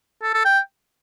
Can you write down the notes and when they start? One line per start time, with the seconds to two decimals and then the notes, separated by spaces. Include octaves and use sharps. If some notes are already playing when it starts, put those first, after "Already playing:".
0.23 A4
0.34 A4
0.45 G5